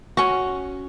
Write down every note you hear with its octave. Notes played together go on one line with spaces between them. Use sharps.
C#4 F#4